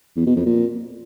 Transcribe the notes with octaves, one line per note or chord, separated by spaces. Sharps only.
E2
B2
F2
A#2